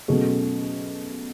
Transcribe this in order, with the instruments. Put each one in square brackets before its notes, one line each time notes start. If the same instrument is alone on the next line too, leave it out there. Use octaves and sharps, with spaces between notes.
[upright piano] B2 F#3 A3 C#4 G#4